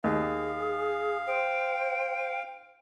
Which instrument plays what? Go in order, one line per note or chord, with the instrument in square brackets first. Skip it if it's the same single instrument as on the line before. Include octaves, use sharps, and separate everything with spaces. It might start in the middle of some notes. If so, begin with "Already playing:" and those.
[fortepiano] D#2 [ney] G#4 [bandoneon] F5
[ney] C5 [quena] G5